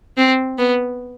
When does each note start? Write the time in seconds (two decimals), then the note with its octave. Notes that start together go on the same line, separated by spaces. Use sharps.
0.17 C4
0.59 B3